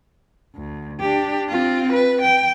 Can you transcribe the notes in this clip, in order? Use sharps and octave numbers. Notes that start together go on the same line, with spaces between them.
D2
D4 G4
C4 F4
B4
G5